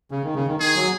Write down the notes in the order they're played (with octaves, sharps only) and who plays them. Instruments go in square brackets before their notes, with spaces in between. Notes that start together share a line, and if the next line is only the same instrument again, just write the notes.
[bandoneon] C#3
D#3
C#3
D#3
[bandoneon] D#3 [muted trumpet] G#4
[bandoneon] F#3